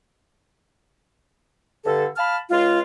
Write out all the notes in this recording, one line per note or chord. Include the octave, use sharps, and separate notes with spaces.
G2 D3 A4
F5 A5 B5 F6
C#2 G#3 F4